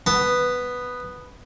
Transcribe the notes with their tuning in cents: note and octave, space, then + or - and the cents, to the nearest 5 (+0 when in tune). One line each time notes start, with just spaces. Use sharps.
B3 +0 A5 +0